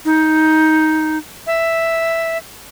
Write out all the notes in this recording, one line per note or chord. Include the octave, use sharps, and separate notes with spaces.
D#4
E5